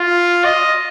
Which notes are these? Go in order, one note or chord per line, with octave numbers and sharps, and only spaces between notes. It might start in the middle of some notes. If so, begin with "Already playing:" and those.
Already playing: F4
D#5